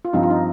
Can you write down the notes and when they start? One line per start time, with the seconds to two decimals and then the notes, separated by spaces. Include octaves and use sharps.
0.05 F4
0.13 G2 F3 C4 D#4
0.23 F4
0.30 D#4